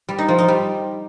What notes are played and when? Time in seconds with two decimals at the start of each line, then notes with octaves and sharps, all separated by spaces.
0.09 G3
0.18 D#4
0.28 F3
0.38 D#4
0.48 G3